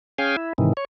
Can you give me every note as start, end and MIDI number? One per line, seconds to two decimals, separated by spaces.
0.18 0.36 61
0.18 0.36 68
0.18 0.36 77
0.18 0.36 79
0.18 0.36 80
0.36 0.53 64
0.58 0.73 44
0.58 0.73 48
0.58 0.73 51
0.58 0.73 52
0.77 0.85 73